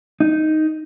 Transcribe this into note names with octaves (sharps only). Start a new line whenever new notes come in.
D#4